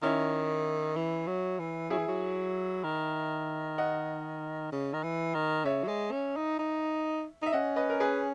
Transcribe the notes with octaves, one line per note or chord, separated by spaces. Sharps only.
D#3 C#4 E4
E3
F#3
E3
F#3 E4 G#4
E3
F#3
D#3
D#5 F#5
C#3
D#3
E3
D#3
C#3 C#5 E5
F#3
G#3
C#4
D#4
D#4
D#4 E5
C#4 D#5 F#5
B4 D#5
A#4
G#4 B4